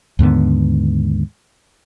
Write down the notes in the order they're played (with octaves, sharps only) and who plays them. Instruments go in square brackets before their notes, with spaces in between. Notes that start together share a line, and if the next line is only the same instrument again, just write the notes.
[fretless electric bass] D#2 G#2 D3 B3